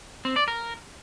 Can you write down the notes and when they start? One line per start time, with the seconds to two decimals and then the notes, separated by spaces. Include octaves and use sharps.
0.25 C4
0.36 D5
0.48 A#4